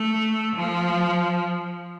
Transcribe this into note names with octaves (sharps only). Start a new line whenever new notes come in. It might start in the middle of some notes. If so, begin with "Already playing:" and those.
Already playing: A3
F3